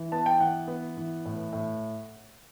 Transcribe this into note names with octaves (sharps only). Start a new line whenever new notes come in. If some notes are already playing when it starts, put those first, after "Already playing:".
Already playing: E3
B3 A5
G5
E3 F#5
B3
E3
A2
A2